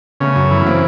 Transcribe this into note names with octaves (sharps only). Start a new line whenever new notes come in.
C#3 A3 B3
F#2
E3
A#3 C4